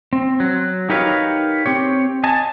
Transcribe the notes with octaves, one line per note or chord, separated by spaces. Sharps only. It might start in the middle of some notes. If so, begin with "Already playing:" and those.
C4
F#3
D#4 G4 A#4 B4 C#5 F5
C4 G4 C#5
D#5 G#5 A5